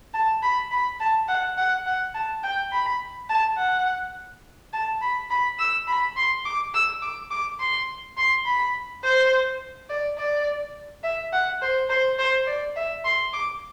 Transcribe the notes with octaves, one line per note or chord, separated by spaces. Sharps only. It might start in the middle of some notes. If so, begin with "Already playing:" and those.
A5
B5
B5
A5
F#5
F#5
F#5
A5
G5
B5
A5
F#5
A5
B5
B5
E6
B5
C6
D6
E6
D6
D6
C6
C6
B5
C5
D5
D5
E5
F#5
C5
C5
C5
D5
E5
C6
D6